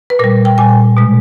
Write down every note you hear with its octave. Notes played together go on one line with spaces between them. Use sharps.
B4
A#2 G3 A#4
G5
A#2 G3 G#5
B2 G#3